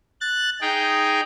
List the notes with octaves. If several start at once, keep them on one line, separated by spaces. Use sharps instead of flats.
F#6 A6
D#4 G#4 G5